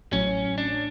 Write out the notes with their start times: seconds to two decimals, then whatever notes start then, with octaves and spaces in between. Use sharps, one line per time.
0.12 A1 A2 F#3 C#4
0.58 D4